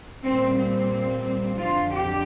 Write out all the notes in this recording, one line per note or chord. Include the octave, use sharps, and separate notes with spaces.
A#2 G3 C4
C4
F2 D3 F3 F4
G4